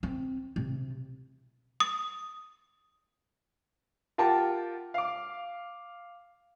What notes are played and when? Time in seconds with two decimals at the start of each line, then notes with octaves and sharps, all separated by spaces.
0.03 C4
0.56 C3
1.80 D#6
4.18 F4 G4 A#4 F#5 G5 A5
4.94 F5 D6